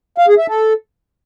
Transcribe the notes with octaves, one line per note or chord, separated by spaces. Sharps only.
F5
G#4
E5
A4